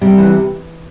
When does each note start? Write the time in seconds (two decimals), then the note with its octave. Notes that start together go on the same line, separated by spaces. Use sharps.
0.01 C3 G3
0.18 E3